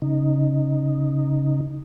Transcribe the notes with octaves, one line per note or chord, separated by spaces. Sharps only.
C#3 D#4